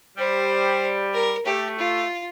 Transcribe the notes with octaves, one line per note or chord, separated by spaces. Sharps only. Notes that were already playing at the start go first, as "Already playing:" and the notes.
G3 C5
A#4
A3 G4
F4